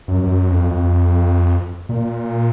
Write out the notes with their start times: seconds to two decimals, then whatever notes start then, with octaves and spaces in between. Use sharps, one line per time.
0.08 F#2
0.24 F#2
0.48 F2
0.71 F2
1.89 A#2